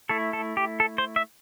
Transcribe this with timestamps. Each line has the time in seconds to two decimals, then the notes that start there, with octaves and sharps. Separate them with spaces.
0.09 A3 E4 A4
0.33 A4
0.57 G4
0.80 A4
0.98 C5
1.16 E5